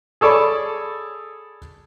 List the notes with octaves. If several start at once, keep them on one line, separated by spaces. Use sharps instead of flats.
G#4 A4 C#5 D5 B5